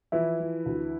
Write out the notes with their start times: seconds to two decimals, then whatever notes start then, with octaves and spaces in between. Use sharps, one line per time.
0.12 E3 F3 E4
0.40 F3
0.66 D2